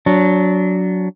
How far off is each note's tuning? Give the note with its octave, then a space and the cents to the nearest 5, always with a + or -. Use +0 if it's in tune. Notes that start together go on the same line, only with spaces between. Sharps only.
F#3 +0 D4 -20